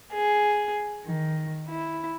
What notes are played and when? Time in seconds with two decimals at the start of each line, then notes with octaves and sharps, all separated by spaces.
0.13 G#4
1.05 D#3
1.69 E4